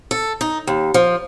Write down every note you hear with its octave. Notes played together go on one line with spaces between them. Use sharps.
A4
D#4
D#2
F3